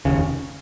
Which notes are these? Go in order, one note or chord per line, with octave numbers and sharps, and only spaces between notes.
F1 D#2 C#3